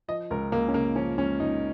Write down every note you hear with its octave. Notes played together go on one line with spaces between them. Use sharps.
F3 D#5
C#2 A#4
C#2 A#3
C#4
C#3 A#3
F3 C#4
C#2 C#4
C#2 D#4